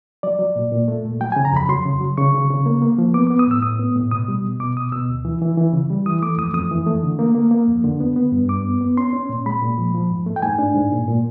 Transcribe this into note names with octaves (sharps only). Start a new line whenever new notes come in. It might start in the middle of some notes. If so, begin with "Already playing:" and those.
F#3 D5
F#3
A#2
A#2
A3
A#2
F#3 G5
G#5
C#3
A#5
F2 B5
F#3 C6
C#3
F#3
C#3 C#6
C#3
C#3
A#3
A#3
F3
B3 D6
B3 D6
D#6
A2 E6
A2 D#6
B3
A2
B2 D#6
G3
B2
B2 D6
B2 D#6
B2 E6
D2
E3
E3
E3
C#3
G3
E3 D#6
A3 D6
F2 D#6
F2 D#6
E3
A3
D3
A#3
A#3
A#3
F2
D3
B3
B3
G2
G2 D6
B3
B3
C#4 C6
C#4
A#2
G#3 B5
A#2
F3
F3
G#2
A3
G5
G#2 G#5
D4
G#2
A#2
A#2